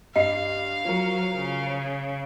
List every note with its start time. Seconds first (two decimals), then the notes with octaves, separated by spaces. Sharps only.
0.16 G2 D#5 F5 C7
0.85 F3 F#3 A#4
1.35 C#3